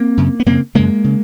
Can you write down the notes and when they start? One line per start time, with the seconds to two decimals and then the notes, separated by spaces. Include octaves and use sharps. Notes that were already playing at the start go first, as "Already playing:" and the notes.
Already playing: A#3 C4
0.17 F#2 C#3
0.40 B3
0.46 F#2 C#3 A#3 C4
0.75 F#2 C#3 G#3 A#3
1.04 C#3